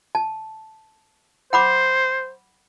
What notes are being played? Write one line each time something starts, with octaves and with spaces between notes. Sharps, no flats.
A5
C5 F#5 B5 D6